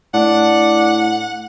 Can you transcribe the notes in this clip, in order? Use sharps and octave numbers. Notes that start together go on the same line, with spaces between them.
A2 D4 F#5